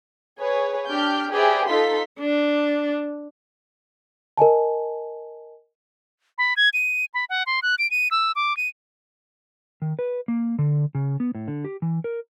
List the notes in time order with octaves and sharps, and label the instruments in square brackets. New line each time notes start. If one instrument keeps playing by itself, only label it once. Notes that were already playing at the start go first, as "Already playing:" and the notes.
[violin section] G#4 B4 C#5
D4 G4 F6 G6
G4 G#4 B4 C5 D5 E5
D#4 F4 A4 C6 B6
[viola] D4
[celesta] A#4 D#5 G#5 A5
[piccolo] B5
G#6
D#7
B5
F#5
C6
F#6
D7
D#7
E6
D6
D#7
[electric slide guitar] D#3
B4
A#3
D3
C#3
B3
A2
D3
G4
E3
A#4